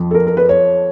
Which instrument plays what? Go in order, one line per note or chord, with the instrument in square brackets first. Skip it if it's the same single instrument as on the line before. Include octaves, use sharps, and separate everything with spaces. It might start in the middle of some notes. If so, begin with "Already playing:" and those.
Already playing: [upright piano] F2 F3
[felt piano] A4
A#4
A#4
B4
C#5